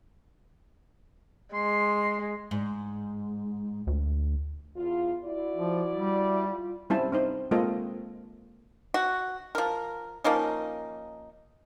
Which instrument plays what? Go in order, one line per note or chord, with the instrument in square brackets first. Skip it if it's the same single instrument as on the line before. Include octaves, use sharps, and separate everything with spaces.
[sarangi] G#3 [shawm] C6
[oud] G#2
[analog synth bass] D2
[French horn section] E2 F4
E4 F#4 D5
[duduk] F3
G3
[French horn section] F4
[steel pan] G3 C4 C#4 E4 C5 A5
C4 D#4 C5
G#3 A#3 C4 F4 A4 D#5
[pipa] F#4
F3 A#4
F3 A#3 C#4 D#4